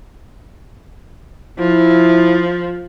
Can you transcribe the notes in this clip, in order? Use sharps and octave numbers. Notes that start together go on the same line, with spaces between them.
F3 E4